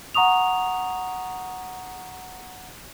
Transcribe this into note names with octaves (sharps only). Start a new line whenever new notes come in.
F#5 A#5 C#6 D#6 F7